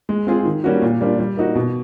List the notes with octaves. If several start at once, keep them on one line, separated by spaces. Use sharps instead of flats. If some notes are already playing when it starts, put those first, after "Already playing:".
G#3
C4 F4 G#4
D#3
G3 A#3 C#4 F#4
A#2
G3 A#3 D4 F4
G3
A#3 D#4 F#4
B2